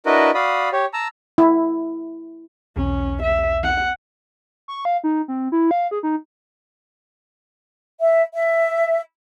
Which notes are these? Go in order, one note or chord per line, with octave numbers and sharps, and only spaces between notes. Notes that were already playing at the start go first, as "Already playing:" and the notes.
D4 E4 F#4 A#4 B4 D#5
F#4 D5 F5 B5 D#6
G4 C#5
A5 A#5 E6
E4
B1 E2 C#4
E5
F#5
C#6
F5
D#4
C4
E4
F5
G#4
D#4
E5
E5